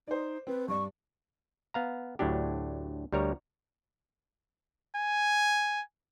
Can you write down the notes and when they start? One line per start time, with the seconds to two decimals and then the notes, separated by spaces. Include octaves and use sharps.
0.07 D#4 C5 D5
0.47 C4 B4
0.68 G2 D5 C#6
1.74 B3 F5 A#5
2.19 D2 A2 F#3 D4 G4
3.12 D2 G3 A#4 C#5 A#5
4.97 G#5